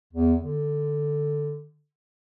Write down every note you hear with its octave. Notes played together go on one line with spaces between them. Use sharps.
E2
D3